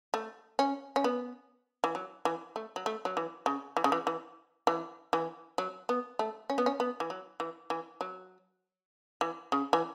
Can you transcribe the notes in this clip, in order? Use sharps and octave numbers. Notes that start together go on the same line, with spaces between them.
A3
C#4
C#4
B3
E3
F#3
E3
A3
F#3
A3
F#3
E3
C#3
E3
C#3
E3
E3
E3
E3
F#3
B3
A3
C#4
B3
C#4
B3
E3
F#3
E3
E3
F#3
E3
C#3
E3